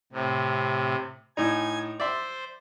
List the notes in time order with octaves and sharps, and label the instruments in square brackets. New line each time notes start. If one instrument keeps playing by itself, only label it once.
[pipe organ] A2 C3
[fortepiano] A2 D#4 [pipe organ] G#5 G#6
[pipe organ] C5 [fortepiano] D5 E5 C6